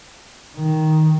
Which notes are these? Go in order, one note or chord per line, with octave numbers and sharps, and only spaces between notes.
D#3